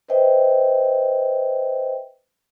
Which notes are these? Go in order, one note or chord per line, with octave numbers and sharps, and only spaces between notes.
B4 C5 D#5 E5 G5